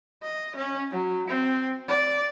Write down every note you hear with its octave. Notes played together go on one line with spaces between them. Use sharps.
D#5
C#4
F#3
C4
D5